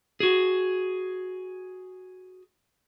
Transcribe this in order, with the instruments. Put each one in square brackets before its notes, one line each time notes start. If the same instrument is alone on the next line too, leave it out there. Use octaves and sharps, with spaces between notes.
[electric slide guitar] F#4 G#4